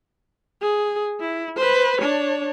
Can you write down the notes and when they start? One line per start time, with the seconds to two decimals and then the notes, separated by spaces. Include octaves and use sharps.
0.61 G#4
1.20 E4
1.57 B4 C5
2.01 D4 C#5